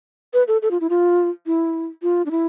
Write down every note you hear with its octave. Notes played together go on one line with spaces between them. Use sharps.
B4
A4
A4
F4
E4
F4
E4
F4
D4
E4